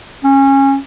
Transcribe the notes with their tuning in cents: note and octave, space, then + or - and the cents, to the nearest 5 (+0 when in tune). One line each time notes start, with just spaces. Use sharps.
C#4 -20